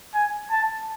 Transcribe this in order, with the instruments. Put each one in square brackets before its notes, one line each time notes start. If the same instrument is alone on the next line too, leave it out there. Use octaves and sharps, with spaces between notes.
[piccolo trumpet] G#5
A5